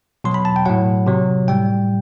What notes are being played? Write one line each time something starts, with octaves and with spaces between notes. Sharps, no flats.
B2 F#3 C6
B5
A5
G5
A2 F#3 F#5
C3 F#3
A2 G3 G5